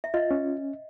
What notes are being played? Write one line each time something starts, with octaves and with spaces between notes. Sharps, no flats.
E5
F4 D#5
C#4